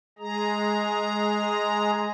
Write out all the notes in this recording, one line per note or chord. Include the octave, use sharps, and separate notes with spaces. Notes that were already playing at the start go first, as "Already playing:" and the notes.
G#3 G#4 A#5